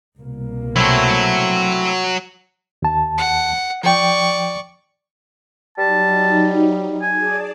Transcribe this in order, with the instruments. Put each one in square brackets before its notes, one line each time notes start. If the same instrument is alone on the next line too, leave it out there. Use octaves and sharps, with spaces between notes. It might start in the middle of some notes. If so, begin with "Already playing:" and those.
[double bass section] C2 B2 A#3
[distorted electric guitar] F#3 [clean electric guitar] A3 C4 E4
[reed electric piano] D#2 A5
[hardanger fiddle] F#5
[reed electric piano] F3 G5 [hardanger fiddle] D5 C#6
[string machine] F#3 D#4 [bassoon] G3 [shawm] A5
[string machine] G#4 D5 A5 [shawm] G#5